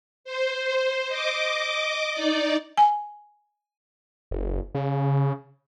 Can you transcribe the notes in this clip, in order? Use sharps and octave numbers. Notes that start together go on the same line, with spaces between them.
C5
D#5 D6
D#4 D5
G#5
F#1
C#3